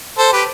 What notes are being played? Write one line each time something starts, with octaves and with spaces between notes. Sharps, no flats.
A4 C5
G4 B4